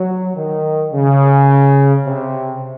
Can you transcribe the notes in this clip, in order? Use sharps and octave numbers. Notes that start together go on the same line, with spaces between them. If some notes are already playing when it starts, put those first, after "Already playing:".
Already playing: F#3
D#3
C#3
C3